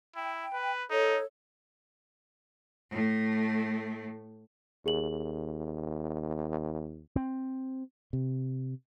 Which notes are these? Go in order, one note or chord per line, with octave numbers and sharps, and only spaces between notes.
E4 G5
B4
D#4 A4 C#5
A2 A3
D#2 G#4 F#7
C4
C3